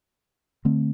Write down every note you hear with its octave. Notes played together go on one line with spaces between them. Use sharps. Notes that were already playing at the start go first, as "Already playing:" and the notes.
D3 A3 C4